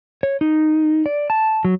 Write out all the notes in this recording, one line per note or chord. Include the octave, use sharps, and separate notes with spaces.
C#5
D#4
D5
A5
F#3